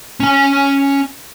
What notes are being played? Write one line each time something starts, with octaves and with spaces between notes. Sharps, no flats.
C#4 G#5